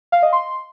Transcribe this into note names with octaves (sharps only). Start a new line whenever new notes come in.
F5
D#5
C6